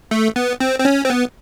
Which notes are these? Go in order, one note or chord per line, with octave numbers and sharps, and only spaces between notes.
A3
B3
C4
C4
C#4
C4
B3